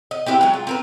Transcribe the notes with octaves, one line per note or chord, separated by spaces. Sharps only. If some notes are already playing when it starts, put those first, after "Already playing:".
D#5
C4 E4 G4 B4
F#3 G#3
F4
C4 A#4 B4